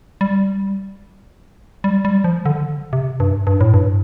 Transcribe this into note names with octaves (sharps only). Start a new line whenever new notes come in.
G3
G3
G3
F3
D3
C3
G2
G2
A2
G2